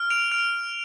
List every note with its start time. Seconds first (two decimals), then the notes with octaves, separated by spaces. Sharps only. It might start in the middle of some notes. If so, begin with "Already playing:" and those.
Already playing: F6
0.10 D7 F7
0.32 F6 D7 F7